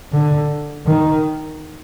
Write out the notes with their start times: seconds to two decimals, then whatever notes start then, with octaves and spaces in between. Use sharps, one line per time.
0.13 D3
0.86 D#3